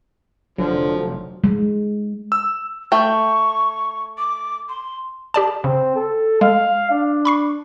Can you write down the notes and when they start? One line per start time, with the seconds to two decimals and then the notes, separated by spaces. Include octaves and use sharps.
0.58 F1 D3 F3 F#3
1.44 G#3
2.32 E6
2.92 A3 G5 C#6
4.18 D6
4.69 C6
5.34 G4 D5 A5
5.64 C#3 C4
5.95 A4
6.41 G#3 F5
6.90 D4
7.25 B5 C#6 C7